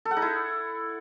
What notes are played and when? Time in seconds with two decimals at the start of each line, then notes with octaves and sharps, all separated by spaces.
0.05 A4
0.11 F#5
0.17 D#4
0.22 E4